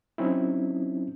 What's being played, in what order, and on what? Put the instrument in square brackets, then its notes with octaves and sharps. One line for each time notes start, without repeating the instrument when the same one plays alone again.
[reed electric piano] F#3 C4 C#4 D#4 E4